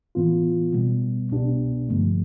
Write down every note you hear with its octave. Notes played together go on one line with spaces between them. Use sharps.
A2 E3 B3 F4
B2 G3 B3
C2 B2 B3 D4 G4
G2 D3 F3 A3